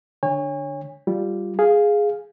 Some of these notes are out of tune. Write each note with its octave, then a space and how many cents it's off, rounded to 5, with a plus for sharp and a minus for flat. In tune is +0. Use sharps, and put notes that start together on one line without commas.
D3 +0 C#5 +0 G#5 -40
G3 -5 F4 +0
G#4 +0 F5 +0